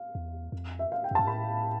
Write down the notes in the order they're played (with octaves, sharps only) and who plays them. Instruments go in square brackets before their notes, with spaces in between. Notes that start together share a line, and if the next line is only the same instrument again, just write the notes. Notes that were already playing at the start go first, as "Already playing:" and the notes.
Already playing: [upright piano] F5
[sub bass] E2
F2
[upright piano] E5
F5
G5
[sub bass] F2
[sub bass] G2 [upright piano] A5
[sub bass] A2 [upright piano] B5